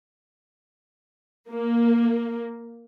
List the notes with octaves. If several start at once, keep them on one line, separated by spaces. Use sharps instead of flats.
A#3